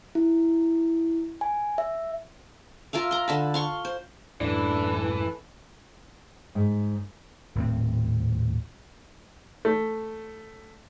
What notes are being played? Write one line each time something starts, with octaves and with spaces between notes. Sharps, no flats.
E4
G#5
E5
F4 A#4 E5 F5
A#5 C6
D3 A5 B5
F5 C6 C#6
C5
F#2 A2 E3 D4 A4
G#2
D#1 A2 C4
A3